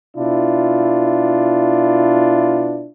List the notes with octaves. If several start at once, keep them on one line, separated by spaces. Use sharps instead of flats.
B2 D4 E4 F4